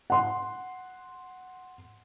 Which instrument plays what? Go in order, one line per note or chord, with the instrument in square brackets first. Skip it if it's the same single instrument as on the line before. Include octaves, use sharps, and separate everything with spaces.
[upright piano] F#5 C6